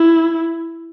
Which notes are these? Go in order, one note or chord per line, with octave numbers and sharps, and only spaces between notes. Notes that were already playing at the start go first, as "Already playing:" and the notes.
Already playing: E4